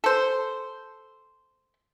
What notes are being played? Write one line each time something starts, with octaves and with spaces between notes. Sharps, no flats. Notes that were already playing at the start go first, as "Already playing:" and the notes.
A4 C5